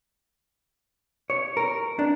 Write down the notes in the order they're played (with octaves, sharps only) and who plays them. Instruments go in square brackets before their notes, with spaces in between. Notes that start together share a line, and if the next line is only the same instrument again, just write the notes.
[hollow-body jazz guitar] C#5
A#4
D4